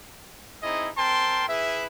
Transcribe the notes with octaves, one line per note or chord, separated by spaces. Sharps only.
C4 D#4 E4 G#4 D#5
C4 A#4 G5 A5 C6
E4 G#4 B4 E5